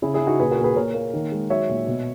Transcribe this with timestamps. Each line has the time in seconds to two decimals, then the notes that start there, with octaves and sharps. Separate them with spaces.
0.02 C#3 E4 G#4
0.14 E4 G#4
0.21 C#3
0.27 D#4 F#4
0.39 A#2 G#4 B4
0.51 F#4 A#4
0.58 A#2
0.64 G#4 B4
0.76 A#2 A#4 C#5
0.94 A#3
1.13 D#3
1.32 G#3
1.50 F#3 C#5 E5
1.69 A#2
1.87 B2